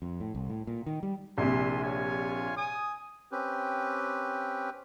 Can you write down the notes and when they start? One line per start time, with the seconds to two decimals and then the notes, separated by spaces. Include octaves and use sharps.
0.02 F2
0.20 A2
0.35 C2
0.50 A2
0.67 A#2
0.86 D#3
1.03 G3
1.38 A#1 C3 E4 G#5 C6
1.84 F4 C#5 G#5
2.56 G#5 D#6
3.32 C4 C#4 G4 B4